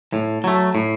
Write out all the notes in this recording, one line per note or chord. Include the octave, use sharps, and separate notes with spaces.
A2
F#3 A3
A2